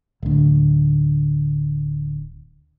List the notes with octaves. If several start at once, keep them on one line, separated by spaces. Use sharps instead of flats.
D1 D2